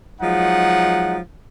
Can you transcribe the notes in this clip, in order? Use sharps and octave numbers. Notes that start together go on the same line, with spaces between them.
F3 F#3 G#3 D#4 F#5